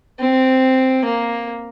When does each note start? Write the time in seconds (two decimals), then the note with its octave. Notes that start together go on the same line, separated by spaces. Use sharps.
0.20 C4
1.05 A#3